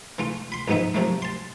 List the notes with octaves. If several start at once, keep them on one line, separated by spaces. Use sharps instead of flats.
E3 A3 F4
B5 C6
A1 G#2 F3 B3 D#4 E5
C3 F3 F#3 A3 A#3
A5 C6